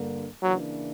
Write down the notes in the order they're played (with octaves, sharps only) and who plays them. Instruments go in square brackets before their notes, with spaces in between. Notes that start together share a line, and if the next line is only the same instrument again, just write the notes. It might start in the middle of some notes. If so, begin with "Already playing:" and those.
Already playing: [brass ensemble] G2 D3 A#3
[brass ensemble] C#3 E3 A#3 D4 [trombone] F#3